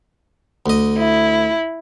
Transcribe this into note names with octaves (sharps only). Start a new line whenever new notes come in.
D2 D#5
E4